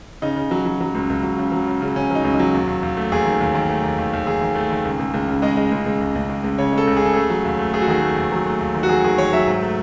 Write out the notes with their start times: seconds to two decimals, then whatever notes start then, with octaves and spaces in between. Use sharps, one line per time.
0.22 C#3 D#4
0.36 C#3
0.51 F#3
0.66 F#3
0.81 F#3
0.95 C#2
1.10 C#2
1.23 F#3
1.38 C#3
1.52 F#3
1.67 C#3
1.82 C#3
1.96 C#3 C#4
2.11 F#3 D#4
2.24 C#2
2.34 D#4
2.39 F#3
2.54 D#2
2.67 D#2
2.83 D#2
2.97 A3
3.12 D#2 G#4
3.25 D#3
3.41 D#2
3.54 D#3
3.69 A3
3.83 D#2
3.98 D#2
4.13 D#2
4.27 D#3 G#4
4.41 D#3
4.55 A3
4.71 D#3
4.85 C#2
4.99 C#2
5.14 C#2
5.28 C#3
5.42 G#3 D#5
5.57 G#3
5.72 C#2
5.86 C#2
6.01 C#2
6.15 C#2
6.30 G#3
6.44 C#2
6.58 C#3 C#5
6.73 G#3 A4
6.87 C#2
6.97 G#4
7.02 C#3 A4
7.14 A3 G#4
7.30 F#3
7.45 D#2
7.59 A3
7.74 A3 G#4
7.82 F#4
7.88 D#3 G#4
8.02 A3
8.17 D#2
8.32 F#3
8.46 A3
8.60 D#2
8.74 D#3
8.83 F#4
8.89 F#3 G#4
9.04 D#3 G#4
9.18 D#3 C#5
9.32 F#3 E5
9.47 G#2
9.62 A3